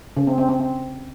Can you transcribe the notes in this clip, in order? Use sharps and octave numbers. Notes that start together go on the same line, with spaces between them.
C#3
C4
C4
C4
C4